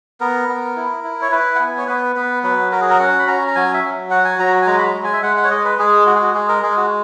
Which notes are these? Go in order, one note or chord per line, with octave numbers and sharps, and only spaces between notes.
B3 A#4
B3
E4
E4
C#5
E4 B4
F#5
B3 G#5
C#5
B3 B4
B3 B4
F#3 B4
F#4 A#4
G#4
A#4
C#4 F#5
B5
C#4 A#5
A#5
F#3 G#5
E5
F#3
F#4 F#5
G#5
F#3 A#5
G#5
G#3 A#5
B5
A#5
G#3
G#5
E5
G#3 F#5
F#5
C#5
G#3 D#5
B4
G#3 G#4
F#4
G#4
F#4
G#3 G#4
A#4
G#3 G#4
F#4